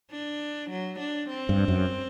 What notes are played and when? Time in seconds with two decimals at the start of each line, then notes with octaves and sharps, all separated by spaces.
0.11 D4
0.70 F#3
1.00 D4
1.29 C4
1.49 G2
1.68 F#2